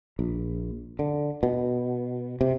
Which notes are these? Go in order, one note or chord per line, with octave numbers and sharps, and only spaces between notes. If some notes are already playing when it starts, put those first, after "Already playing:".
A#1
D3
B2
C3